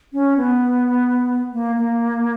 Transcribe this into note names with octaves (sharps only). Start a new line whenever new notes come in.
C#4
B3
A#3
A#3